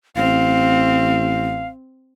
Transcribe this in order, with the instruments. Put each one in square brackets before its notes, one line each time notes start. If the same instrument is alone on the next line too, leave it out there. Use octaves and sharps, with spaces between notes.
[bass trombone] A1 [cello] C4 [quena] F5